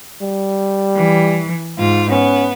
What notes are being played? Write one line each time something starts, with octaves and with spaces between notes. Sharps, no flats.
G3
E3
G#2 F4
B3 C#4